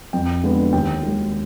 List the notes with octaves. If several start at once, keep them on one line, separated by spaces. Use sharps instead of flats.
F2 G5
D3 G#3 B3
D#2 G5
D#3 G#3